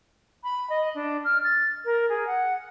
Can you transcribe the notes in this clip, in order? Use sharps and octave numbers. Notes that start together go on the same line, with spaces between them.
B5
D#5
D4
F6
A6
A#4
G#4
F#5